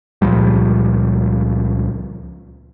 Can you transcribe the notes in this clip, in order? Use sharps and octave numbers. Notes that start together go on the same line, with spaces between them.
C#2 A#2 F3 G3